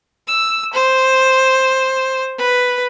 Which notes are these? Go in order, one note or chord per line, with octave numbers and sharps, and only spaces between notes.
E6
C5
B4